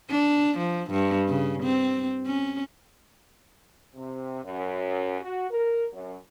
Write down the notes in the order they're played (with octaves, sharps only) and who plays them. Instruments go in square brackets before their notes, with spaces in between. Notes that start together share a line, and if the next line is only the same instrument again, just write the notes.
[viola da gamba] D4
F3
G2
C#3
C4
C#4
[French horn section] C3
F#2
F#4
A#4
F#2